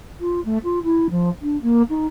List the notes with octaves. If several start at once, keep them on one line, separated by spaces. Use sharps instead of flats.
F4
A3
F4
E4
F3
D4
A#3
D#4